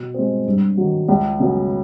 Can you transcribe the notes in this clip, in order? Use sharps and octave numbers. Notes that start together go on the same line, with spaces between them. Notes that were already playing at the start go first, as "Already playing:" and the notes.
Already playing: B2
G#3 C4
G2
D#3 F#3
C#2
C#3 F#3 B3